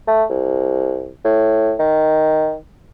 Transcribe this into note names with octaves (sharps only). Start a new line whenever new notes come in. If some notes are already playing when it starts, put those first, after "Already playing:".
A3
C2
A2
D#3